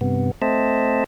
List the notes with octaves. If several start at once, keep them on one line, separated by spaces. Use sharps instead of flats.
G2 C3 B3
A3 C4 C5 D#5 E5 A5